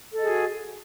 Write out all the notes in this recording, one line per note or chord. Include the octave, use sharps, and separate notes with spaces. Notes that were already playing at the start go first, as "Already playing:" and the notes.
F#4 G#4 A4 D#5